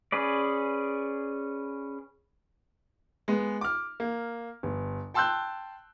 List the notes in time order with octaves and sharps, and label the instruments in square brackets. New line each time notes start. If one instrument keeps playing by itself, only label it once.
[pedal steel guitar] C#4 G#4 B4 D5
[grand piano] G#3 B3
D6 F6
A#3
G1
G5 A5 C6 E6 F#6 G6